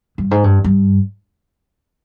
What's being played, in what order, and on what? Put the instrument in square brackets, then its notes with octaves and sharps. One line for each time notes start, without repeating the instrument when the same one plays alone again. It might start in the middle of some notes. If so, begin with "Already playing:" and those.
[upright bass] G2
G#2
G2
G2